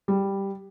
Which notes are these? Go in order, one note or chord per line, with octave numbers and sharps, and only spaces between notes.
G3